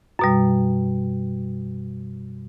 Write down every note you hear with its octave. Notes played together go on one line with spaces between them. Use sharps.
F#2 B2 G3